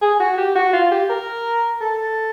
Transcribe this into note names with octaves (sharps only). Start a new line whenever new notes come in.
G#4
F#4
G4
F#4
F4
G4
A#4
A4